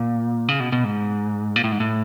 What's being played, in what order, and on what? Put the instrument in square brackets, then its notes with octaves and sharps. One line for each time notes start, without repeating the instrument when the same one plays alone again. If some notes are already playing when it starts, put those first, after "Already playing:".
Already playing: [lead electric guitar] A#2
C#3
B2
B2
G#2
A#2
A2
G#2
A2